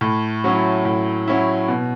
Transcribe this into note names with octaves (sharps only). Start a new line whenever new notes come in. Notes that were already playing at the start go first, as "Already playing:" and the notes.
A2
F#3 C#4 E4
A2
F#3 C#4 E4
B2